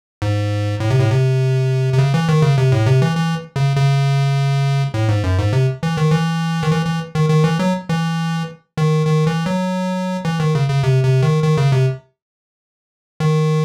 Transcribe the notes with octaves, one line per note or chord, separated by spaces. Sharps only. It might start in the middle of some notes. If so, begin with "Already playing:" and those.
G#2
A2
C3
A2
C3
C3
C#3
E3
D#3
C#3
C3
A2
C3
E3
E3
C#3
C#3
A2
G#2
F#2
G#2
C3
E3
D#3
E3
D#3
E3
E3
D#3
D#3
E3
F#3
E3
D#3
D#3
E3
F#3
E3
D#3
C#3
C#3
C3
C3
D#3
D#3
C#3
C3
D#3